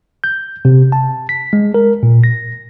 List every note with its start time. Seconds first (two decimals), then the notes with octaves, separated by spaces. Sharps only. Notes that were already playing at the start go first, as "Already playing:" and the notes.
0.24 G6
0.65 C3
0.92 A5
1.29 B6
1.53 G#3
1.74 A#4
2.03 A#2
2.24 A#6